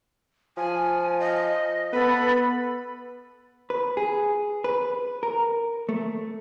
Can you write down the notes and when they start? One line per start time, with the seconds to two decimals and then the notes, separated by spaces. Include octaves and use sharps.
0.57 F3 G#5
1.20 D#5
1.93 B3 A4 B4 B5
3.70 B4
3.97 G#4
4.64 B4
5.23 A#4
5.89 A3